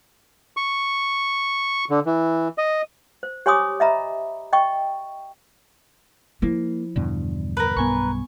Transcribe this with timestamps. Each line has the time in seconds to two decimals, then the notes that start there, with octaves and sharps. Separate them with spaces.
0.57 C#6
1.90 D3
2.06 E3
2.58 D#5
3.23 C5
3.46 G4 C#5 G#5 C6 D6 D#6
3.80 D#5 E5 A#5 B5
4.53 D#5 G5 C#6
6.42 F3 A#3 E4
6.96 E2 G2 B2 D3
7.57 A#4 B4
7.76 B1 G2 B3 G#5 C#6